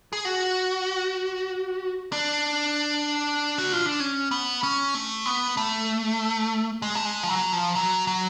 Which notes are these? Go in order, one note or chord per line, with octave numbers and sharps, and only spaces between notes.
G#4
F#4
D4
F#4
F4
D4
C#4
B3
C#4
A3
B3
A3
G#3
A3
G#3
F3
F#3
F3
F#3
F#3